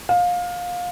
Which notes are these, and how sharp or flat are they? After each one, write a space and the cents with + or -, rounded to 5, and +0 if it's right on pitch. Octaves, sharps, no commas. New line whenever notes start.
F5 +25